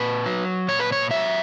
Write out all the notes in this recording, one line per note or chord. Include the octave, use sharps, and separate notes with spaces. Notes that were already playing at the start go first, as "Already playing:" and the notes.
Already playing: A#2 B4
F#3
A#2 C#5
B4
C#5
F#3 E5